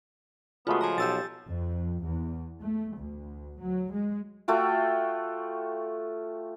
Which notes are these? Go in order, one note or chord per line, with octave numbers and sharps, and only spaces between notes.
C#3 G#3 A3 B3 F4 F#4
F3 G#5 A#5
B1 G4 E6 A6
F2
E2
A3
D2
F#3
G#3
A3 F4 F#4 G5